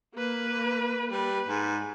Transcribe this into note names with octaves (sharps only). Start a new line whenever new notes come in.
A#3 B4
G3 B4
G#2